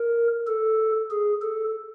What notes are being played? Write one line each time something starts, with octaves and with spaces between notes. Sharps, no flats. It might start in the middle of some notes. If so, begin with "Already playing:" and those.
Already playing: A#4
A4
G#4
A4